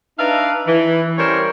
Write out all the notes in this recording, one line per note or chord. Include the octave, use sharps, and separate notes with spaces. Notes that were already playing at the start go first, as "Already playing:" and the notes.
D4 D#4 B4 E5 F5 A#5
E3
G3 C#4 A#4 C5 C#5